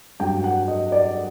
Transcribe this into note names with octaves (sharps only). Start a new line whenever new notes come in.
G2 F#3 G5
F#5
D#5
D5